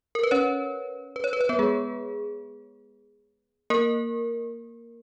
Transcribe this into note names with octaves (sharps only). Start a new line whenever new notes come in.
A#4
B4
C#4 C#5
B4
C#5
B4
C#5
B3 B4
G#3 G#4
A#3 A#4